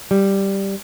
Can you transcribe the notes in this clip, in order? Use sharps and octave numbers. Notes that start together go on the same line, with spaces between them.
G3